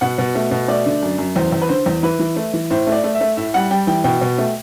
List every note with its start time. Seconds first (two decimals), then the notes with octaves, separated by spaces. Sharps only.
0.01 B2 F#5
0.18 B2
0.35 A3
0.51 B2
0.68 A3 D5
0.86 D3
1.02 F#2
1.18 F#2
1.35 E2 C5
1.52 E2
1.62 B4
1.69 D3 C5
1.86 E2
2.03 E3 B4
2.19 E3
2.36 A3
2.53 E3
2.70 A2 C5
2.87 A3
2.92 D5
3.04 A3
3.15 E5
3.21 A3
3.37 A2 E5
3.54 G3 F#5
3.71 G3 G5
3.87 E3 G5
4.04 B2 G5
4.21 B2
4.38 A3